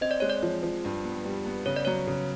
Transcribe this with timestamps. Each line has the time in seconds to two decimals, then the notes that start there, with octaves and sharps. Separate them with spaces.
0.01 C4 D#5
0.11 D5
0.20 G#3 C#5
0.30 D5
0.43 F3
0.63 F3
0.85 G2
1.05 B3
1.25 G3
1.46 B3
1.66 C#3 C#5
1.76 D5
1.85 F#3 C#5
2.07 C#3